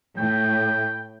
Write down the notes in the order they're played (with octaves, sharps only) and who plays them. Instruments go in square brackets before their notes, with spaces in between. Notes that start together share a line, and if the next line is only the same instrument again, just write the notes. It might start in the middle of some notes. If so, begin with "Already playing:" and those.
[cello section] A2 [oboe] G5